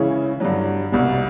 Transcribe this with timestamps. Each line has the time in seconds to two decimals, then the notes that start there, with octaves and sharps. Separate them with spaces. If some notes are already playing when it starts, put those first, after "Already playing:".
Already playing: C#3 E3 G#3 C#4 E4
0.40 G2 D3 F#3
0.92 C2 B2 G3